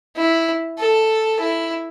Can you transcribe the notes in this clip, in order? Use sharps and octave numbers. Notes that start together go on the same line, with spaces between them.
E4
A4
E4